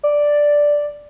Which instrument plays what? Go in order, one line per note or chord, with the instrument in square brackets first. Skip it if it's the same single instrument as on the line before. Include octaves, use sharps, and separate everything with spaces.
[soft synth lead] D5